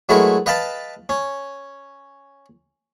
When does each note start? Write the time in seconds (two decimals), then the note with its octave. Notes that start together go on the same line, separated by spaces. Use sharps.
0.09 F#3 G#3 A3 E4 A#4 B4
0.46 B4 D#5 F5 G5 A5 B5
1.09 C#4